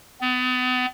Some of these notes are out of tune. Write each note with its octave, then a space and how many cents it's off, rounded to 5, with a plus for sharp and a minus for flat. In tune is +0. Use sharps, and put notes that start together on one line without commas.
B3 +35